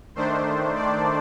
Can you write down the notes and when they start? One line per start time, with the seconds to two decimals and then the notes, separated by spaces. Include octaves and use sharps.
0.15 D#3 A3 D4 C5
0.75 D5